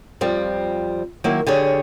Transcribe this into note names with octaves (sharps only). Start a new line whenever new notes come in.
F2 F3 G3 C4
D#3 F#3 A#3 E4
D3 G4 G#4 C#5